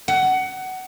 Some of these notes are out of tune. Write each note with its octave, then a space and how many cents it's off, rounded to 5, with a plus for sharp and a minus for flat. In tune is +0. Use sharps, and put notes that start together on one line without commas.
F#5 +20